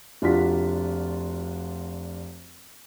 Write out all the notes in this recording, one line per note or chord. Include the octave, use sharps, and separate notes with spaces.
F1 D4 F4 F#4 B6